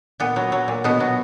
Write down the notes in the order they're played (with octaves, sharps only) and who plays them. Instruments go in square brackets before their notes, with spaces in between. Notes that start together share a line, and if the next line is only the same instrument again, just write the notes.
[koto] A#2 B3
F#3
F#3
A#2
B2 B3
F#3